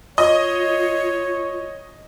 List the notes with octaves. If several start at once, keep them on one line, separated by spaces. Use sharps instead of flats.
F4 C#5 D#5